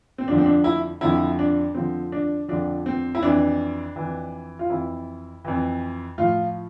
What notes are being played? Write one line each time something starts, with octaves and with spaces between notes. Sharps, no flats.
C4
F2 D3 F3 D4
C4
D4
E4
F2 D3 F3 E4
D4
F2 D3 F3 C4
D4
F2 D3 F3 D4
C4
E4
F2 E3 D4
F2 E3
F4
F2 E3 E4
F2 E3
A2 F3 F4